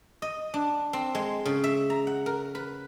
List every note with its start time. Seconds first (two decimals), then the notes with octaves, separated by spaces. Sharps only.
0.22 D#5
0.54 D4
0.93 C4
1.15 G#3
1.45 C#3
1.64 E5
1.90 A#5
2.07 F#5
2.26 A#4
2.55 B4